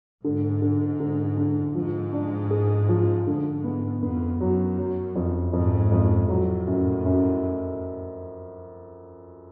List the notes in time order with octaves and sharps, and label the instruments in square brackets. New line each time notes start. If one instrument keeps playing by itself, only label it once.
[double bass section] G#2 [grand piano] D3
[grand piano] D3
D3
D3
[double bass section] G#2 [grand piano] F3
[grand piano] D4
G#4
F3
[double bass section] G#2 [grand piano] D3
[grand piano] B3
[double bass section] F2 [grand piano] B3
[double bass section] F#2 [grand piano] F#3
[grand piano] F#3
F2
[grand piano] F2 [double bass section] G#2
[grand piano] F2
[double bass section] A2 [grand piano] F#3
[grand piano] F#2
F#2